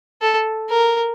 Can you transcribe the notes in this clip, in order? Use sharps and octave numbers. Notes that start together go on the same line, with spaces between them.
A4
A#4